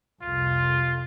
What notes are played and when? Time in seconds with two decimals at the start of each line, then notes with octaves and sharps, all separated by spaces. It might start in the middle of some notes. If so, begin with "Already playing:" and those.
0.22 C2 F2 F4